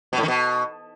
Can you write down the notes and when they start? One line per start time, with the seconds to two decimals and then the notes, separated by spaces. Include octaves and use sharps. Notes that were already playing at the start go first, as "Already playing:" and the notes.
0.13 B2
0.18 A2
0.23 D#3
0.28 B2